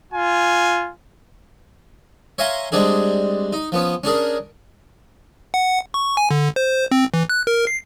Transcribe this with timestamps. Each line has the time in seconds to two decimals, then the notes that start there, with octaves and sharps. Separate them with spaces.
0.12 F4 G#5
2.38 C#5 E5 F5 G#5 A#5 C6
2.72 G3 G#3 C4 D4 G#4
3.53 D#4
3.72 F3 B3 C#4
4.04 C#4 D4 G#4 A#4
5.54 F#5
5.94 C#6
6.17 G#5
6.31 D3
6.56 C5
6.91 C4
7.14 E3
7.29 F#6
7.47 A#4
7.67 C7